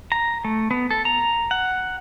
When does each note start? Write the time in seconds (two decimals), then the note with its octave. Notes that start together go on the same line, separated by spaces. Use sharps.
0.12 A#5
0.45 A3
0.71 B3
0.91 A4
1.05 A#5
1.51 F#5